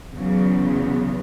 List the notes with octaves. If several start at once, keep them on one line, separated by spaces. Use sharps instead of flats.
E2 C#3 F#3
B3